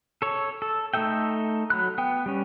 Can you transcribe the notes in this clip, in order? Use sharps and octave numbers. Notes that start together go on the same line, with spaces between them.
A4 C#5
A4
A3 D#4 A4 E5 G5
F#3 B5 F#6
B3 G5
G3 C#4